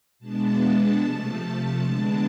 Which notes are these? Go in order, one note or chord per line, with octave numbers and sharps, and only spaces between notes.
B2 G#3 B3 D4 A5
C3 F3 A3 A5
D3 G#3 B3 D4